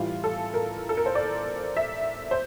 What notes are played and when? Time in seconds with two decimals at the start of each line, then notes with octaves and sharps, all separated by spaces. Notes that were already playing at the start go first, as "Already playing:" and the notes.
Already playing: A2 E3 G3 F4
0.24 A4
0.54 A#4
0.89 A4
0.97 A#4
1.06 C5
1.15 D5
1.77 E5
2.31 C5